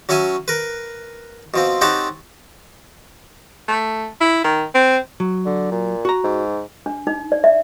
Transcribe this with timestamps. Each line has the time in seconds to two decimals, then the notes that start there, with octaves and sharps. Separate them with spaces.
0.09 F#3 C#4 C#5 E5 G#5
0.48 A#4 B4
1.54 B2 F3 C4
1.81 C4 D#4 G4 C#5 F#5 A5
3.68 A3
4.21 E4
4.44 D#3
4.74 C4
5.20 F#3
5.46 D3
5.71 A#2
6.05 F#4 A#5
6.23 G#2
6.86 D4
7.07 D#4
7.32 D5
7.44 E5